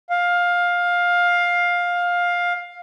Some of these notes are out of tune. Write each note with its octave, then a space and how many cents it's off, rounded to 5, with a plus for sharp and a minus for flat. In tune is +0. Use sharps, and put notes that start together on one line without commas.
F5 +15